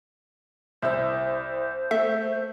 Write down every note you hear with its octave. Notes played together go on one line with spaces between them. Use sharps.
C2 E4 C5 E6
A3 E5